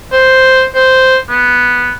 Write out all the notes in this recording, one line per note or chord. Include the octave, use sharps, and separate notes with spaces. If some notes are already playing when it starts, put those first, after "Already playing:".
C5
C5
B3